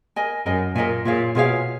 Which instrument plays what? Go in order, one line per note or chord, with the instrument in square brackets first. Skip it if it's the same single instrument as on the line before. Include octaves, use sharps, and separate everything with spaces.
[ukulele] A#4 D#5 G#5
[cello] F#2 [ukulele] A#4 D#5 G#5
[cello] A#2 [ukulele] A#4 D#5 G#5
[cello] A#2 [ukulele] F4 G#4 C#5 F5
[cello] B2 [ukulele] F4 G#4 C#5 F5